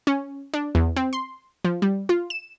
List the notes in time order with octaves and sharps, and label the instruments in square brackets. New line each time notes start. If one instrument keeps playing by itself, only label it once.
[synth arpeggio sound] C#4
D4
E2
C4
C6
F3
G3
F4
E7